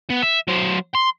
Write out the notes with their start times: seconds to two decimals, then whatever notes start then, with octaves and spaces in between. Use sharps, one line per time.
0.10 B3
0.22 E5
0.48 F#3 C5
0.95 C6